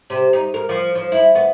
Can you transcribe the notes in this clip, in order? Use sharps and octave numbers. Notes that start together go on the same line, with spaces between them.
C3
D#4
A#4
F3
F3
E4
B3